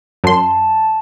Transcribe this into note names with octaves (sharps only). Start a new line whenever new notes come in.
F#2 A5 C6